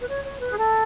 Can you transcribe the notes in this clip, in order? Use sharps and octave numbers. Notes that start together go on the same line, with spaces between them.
B4
C#5
C#5
B4
G#4
A4